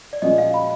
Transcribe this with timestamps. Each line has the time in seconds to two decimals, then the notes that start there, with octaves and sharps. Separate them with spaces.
0.13 D5
0.22 A#2 F3 G#3 C#4 F#4 D#5
0.38 F5
0.54 B5